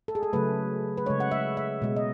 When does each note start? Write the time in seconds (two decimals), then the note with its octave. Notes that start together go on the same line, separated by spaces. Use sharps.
0.08 A4
0.15 G#4
0.23 A4
0.33 C#3 F#3 A3 B4
0.98 B4
1.06 C#3 G#3 C#5
1.20 F#5
1.31 E5
1.57 E5
1.82 B2 G#3
1.96 D#5